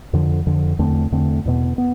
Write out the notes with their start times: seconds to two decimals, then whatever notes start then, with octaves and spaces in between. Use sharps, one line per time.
0.13 F2 D3 F3
0.47 F2 D3 F3
0.79 E2 D3 A3 C4
1.12 E2 D3 A3 C4
1.45 E2 B2 B3
1.78 B3